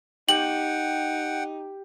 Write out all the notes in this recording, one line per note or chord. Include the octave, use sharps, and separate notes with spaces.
D#4 G4 F#5 G5 F#7